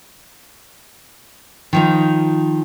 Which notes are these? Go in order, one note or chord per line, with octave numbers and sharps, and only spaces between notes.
D#3 F3 D#4